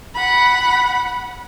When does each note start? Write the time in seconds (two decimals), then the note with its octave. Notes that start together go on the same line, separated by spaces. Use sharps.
0.14 F#5 B5